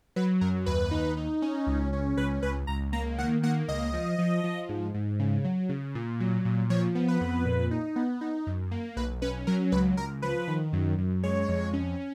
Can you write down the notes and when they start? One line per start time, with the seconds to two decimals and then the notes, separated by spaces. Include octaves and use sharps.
0.16 F#3 B4
0.41 F#2 A#4
0.66 D#2 B4
0.91 D#4
1.17 D#4
1.42 C#4
1.67 C#2
1.93 C#4
2.17 C#2 B4
2.42 C#2 B4
2.67 C#2 A#5
2.93 A#3 A#5
3.18 D#3 F#5
3.43 A#3 F#5
3.68 C#2 D#5
3.93 F3
4.18 F3
4.44 F3
4.69 G#2
4.94 G#2
5.19 C#3
5.44 F#3
5.69 C#3
5.95 A#2
6.20 F#3
6.45 A#2
6.70 F3 C#5
6.95 B3
7.08 B4
7.21 F2
7.46 A#2
7.71 D#4
7.96 B3
8.21 D#4
8.47 F#2
8.71 A#3
8.96 B1 B4
9.22 C#4 B4
9.47 F#3 A#4
9.72 C#2 B4
9.97 C#2 A#4
10.22 F3 B4
10.48 D#3
10.73 F#2
10.98 F#2
11.23 G#3 C#5
11.48 F2
11.73 C#4